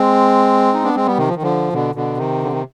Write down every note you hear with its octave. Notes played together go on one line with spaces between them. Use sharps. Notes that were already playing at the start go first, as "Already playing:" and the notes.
Already playing: G#3 C4
D#4
B3 D4
G#3 C4
G3 B3
C3 D#3
F3
D#3
D3 F3
B2 D3
B2 D3
C3 D#3
D3
D#3